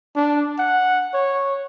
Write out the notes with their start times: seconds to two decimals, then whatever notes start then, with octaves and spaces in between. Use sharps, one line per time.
0.16 D4
0.58 F#5
1.14 C#5